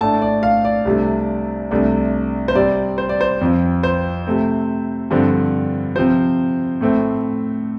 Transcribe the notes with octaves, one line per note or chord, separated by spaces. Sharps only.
A2 A3 D4 A5
D5
F5
D5
C2 C3 A3 D4
C2 C3 A3 D4
C5
C3 G3 C4 D5
C5
D5
C5
F2 F3 C4
C5
C3 A3 C4
G2 D3 F3 C4
C3 F3 C4 C5
A2 A3 C4